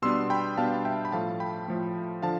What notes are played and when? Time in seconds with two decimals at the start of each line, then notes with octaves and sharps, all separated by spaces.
0.02 B2 G3 B3 D4 C6 E6
0.30 G5 B5
0.57 B2 G3 B3 D4 F5 A5
0.85 E5 G5
1.05 B5
1.12 A2 F3 A3 F5 A5
1.40 G5 B5
1.68 A2 F3 A3
2.22 D3 F3 F5 A5